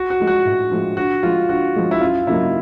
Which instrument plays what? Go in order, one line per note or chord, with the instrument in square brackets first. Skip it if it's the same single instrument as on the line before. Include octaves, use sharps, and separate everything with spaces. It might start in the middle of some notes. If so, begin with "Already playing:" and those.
Already playing: [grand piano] F#4
F#4
[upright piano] F3 G#3
[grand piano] F#4
[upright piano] A2
F3 G#3
[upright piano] D3 [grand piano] F#4
[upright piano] F3 G#3 [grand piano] F4
[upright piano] D3 [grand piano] F#4
[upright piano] F3 G#3
[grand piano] E4
[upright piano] F#2 [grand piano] F4
[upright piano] C#3 F#3 A#3 D#4 [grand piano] E4